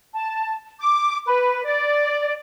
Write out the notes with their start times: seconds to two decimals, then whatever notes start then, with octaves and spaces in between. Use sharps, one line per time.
0.14 A5
0.80 D6
1.27 B4
1.65 D5